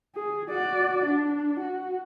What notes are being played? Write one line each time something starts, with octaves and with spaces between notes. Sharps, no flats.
G#4
F#4 D5
D4
F#4